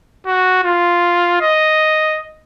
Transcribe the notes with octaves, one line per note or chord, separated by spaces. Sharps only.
F#4
F4
D#5